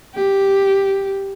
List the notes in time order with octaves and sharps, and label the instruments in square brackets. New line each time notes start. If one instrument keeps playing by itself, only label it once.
[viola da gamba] G4